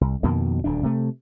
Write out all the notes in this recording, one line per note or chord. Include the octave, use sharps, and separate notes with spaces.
C2
F2 B2 D#3 A#3
D#1 D2 D4
C3 A3